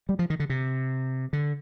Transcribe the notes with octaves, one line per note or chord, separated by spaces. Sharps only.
G3
F3
D#3
D3
C3
D3